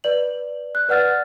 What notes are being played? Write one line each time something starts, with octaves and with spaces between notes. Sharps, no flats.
B4 D5 F#7
F#6
B4 D5 F#5 F6 A6